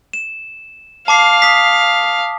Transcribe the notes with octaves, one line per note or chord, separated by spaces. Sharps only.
E7
F5 A5 D6 C7
D#6 B6